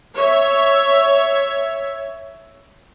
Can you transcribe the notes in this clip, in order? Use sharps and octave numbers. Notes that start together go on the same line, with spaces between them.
C#5 E5